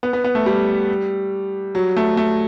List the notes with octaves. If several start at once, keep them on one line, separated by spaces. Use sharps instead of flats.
B3
B3
B3
A3
G3
F#3
A3
A3